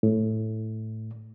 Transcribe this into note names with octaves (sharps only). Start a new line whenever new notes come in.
A2